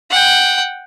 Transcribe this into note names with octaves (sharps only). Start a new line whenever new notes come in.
F#5 G5